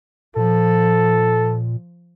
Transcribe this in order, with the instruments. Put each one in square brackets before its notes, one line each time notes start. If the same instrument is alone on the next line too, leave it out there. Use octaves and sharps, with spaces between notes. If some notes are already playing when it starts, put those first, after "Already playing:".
[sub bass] A#2 [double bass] F3 [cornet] A4